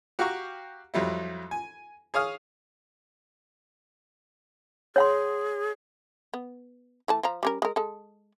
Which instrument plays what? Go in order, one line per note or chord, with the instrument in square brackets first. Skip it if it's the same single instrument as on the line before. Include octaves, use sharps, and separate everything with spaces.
[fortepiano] F#4 G4 F5 F#5 A#5 C#6
F2 F#3 G3 E4
G#5
G#4 C#5 F5 D#6 F6
[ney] G#4 [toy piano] C#5 F#5 C6
[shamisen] B3
E3 A3 A5
F3 A#5
G3 C#4 A#4
G#3 A#4
G#3 A4